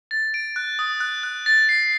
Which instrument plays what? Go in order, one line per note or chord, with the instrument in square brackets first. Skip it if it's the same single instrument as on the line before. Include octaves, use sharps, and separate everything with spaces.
[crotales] A6
D7
F#6
D#6
F#6
F#6
A6
C7